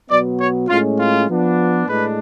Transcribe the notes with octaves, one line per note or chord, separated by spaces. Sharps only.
B2 F#3 B3 D5
C#5
A2 G#3 C#4 F4
F4
F3 B3 D4
A2 G#3 D4 B4